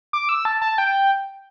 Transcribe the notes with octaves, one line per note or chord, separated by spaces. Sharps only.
D6
E6
A5
A5
G5